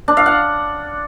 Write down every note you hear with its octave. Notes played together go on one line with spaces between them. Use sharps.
D4
F5
F#5